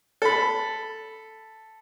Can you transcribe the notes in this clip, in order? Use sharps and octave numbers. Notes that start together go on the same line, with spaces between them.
A4 B5